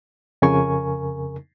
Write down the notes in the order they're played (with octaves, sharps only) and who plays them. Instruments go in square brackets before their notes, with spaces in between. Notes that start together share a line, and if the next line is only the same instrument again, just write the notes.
[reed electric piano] F2 C#3 A#4 G#5 C#6